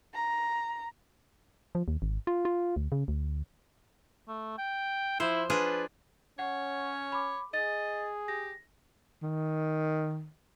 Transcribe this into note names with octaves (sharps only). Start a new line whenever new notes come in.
A#5
F3
D#2
G#1
F4
F4
D2
C#3
D2
A3
G5
F3 E4 C5
D4 F4 G#4 B4
C#4 C#5 F#5
B5 D6
G#4 D#5 A6
G4 A#6
D#3